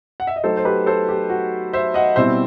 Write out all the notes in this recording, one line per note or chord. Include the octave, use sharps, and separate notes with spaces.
F#5
E5
D#5
F#3 A3 D#4 A4 C5
C5
G4 B4
A4 C5
G4
F#4
C5 E5
D#5 F#5
B2 G3 C4 E4 C5 E5